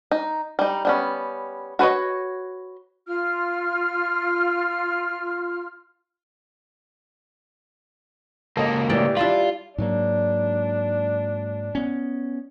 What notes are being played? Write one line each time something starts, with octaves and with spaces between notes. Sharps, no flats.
D#4
G3 D#4
G3 B3 C#4
F#4 B4 C#5 D#5
F4 F6
C#2 A#3 A4 D#5
A2 E3 G4 D5 G5
G3 D4 E4 F4 A5 B5
G#2 F#3 A#3 D4
B3 C#4